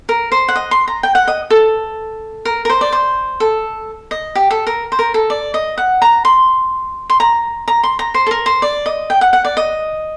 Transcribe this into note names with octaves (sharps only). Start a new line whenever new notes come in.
A#4
C5
F#5
D#5
C6
A#5
G5
F#5
D#5
A4
A#4
A#4
C5
D5
C5
A4
D#5
G4
A4
A#4
C5
A#4
A4
D5
D#5
F#5
A#5
C6
C6
A#5
A#5
C6
A#5
C5
A4
A#4
C5
D5
D#5
G5
F#5
F#5
D5
D#5